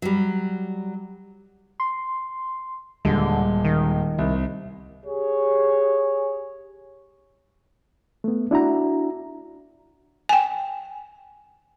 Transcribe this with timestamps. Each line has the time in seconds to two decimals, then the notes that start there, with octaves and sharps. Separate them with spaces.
0.02 F#3 G3
1.80 C6
3.05 D#1 D3 G3 G#3
3.65 D#3
4.18 C2
5.05 G4 G#4 C#5
8.24 A3 B3
8.51 D4 E4 F#4 A#5
10.29 G5 G#5